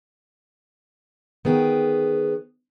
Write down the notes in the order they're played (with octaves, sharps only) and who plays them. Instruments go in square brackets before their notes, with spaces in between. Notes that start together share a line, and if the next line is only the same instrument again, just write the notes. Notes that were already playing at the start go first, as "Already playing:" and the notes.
[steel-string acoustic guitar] D#3 B3 G#4 G5